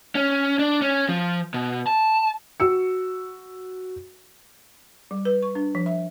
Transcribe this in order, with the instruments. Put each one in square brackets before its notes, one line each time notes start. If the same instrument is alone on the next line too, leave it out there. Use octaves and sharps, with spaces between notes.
[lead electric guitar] C#4
D4
C#4
F3
B2
A5
[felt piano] F#4 E6 C#7
[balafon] G3
B4
C#6
D4
F3
E5